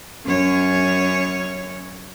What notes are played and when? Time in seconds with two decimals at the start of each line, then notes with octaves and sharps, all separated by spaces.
0.25 F#2 C#4 C#5